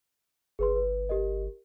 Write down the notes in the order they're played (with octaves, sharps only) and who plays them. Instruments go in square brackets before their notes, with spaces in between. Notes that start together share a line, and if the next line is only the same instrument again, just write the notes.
[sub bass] G1 [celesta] G#4 B4 C6
[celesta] B4
G4 A#4 D#5